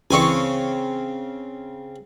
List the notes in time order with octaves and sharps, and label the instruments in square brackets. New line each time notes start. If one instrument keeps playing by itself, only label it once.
[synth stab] C#2 E3 C#6 [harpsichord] C#3 C4 G#5